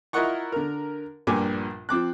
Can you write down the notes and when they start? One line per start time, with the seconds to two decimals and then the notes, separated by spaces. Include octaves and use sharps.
0.13 E4 F4 A#4 D#5 F#5 C#6
0.52 D3 A#4
1.27 A#1 G2 A#2 G#5 D6
1.89 F3 C4 D6 F#6